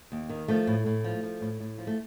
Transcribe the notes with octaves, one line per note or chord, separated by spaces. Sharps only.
D#2
D#3
F3 A3
A2
A2
F3
F3
A2
A2
F3
A3